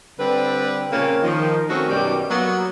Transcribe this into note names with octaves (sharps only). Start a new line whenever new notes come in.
D3 G3 C4 B4
A#2 C#3 A#3 C4 C#4
D#3 F3
D#3 A3 C4 C#4 D#4 F#4
F#2 B2 D#3 G3
F#3 A#3 B3